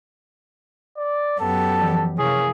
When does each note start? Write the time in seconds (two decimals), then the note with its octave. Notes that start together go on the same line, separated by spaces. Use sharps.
0.97 D5
1.40 F#2 B3 G4 A4
1.82 E3 F3
2.18 C3 E3 A#3 C#4 G#4